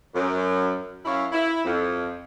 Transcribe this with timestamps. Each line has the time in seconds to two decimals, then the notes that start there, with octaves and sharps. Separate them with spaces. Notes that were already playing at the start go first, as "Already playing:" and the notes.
0.14 F#2
1.05 F#2 E4 C#5 E5 F5
1.32 E4
1.64 F2